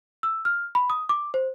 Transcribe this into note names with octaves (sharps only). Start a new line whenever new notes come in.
E6
F6
B5
D#6
D6
C5